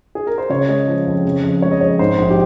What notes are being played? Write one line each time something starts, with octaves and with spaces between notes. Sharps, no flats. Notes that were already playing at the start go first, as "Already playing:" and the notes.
G#4
A#4
C5
C#3 C#5
G#3 D#5
F3
F2
C#3
F2
G#3 C#5
D#5
F2 C#5
G#2 C5
A#1
G4